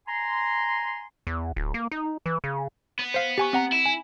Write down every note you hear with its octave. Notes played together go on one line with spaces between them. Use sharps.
G#5 A#5 C6
E2
D1
A#3
D#4
E3
C#3
B3
C5 F5
G4 G#5 C#6
C4 F#5 A#5
E4
G#5